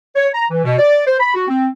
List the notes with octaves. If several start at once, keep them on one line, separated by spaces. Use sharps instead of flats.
C#5
A#5
E3
B2
D5
C5
B5
F#4
C4